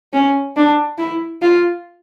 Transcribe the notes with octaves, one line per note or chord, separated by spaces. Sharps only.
C#4
D4
E4
F4